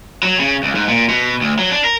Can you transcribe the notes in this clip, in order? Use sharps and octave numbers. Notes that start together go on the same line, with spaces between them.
F#3
C#3
C#2
G#2
A#2
B2
D2
F#3
D4
A#4